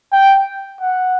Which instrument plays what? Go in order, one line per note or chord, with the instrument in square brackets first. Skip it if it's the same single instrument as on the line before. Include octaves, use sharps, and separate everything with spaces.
[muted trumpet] G5
F#5